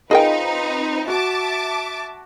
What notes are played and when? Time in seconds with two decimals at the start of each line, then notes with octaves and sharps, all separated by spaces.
0.11 C4 D#4 F4 G#4 A#4 B4 D#5 G5
1.08 F#4 E5 A5 D6